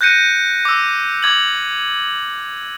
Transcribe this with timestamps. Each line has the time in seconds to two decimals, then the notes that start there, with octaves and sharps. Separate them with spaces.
0.01 F#6 G6 A#6 C#7 D#7
0.65 D6 E6
1.23 D6 G#6 F#7